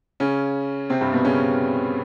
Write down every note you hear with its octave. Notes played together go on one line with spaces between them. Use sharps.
C#3 C#4
C3 C4
G2 G3
B2 B3
C#3 C#4